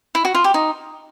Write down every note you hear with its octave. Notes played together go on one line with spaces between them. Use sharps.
E4
F#4
F4
G4
D#4